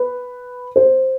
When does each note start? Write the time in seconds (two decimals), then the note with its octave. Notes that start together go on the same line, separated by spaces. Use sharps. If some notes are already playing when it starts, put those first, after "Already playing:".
Already playing: B4
0.76 C5